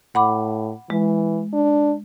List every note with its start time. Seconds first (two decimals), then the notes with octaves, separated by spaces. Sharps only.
0.15 A2 F#5 B5 D6
0.90 E3 G#3
1.53 D4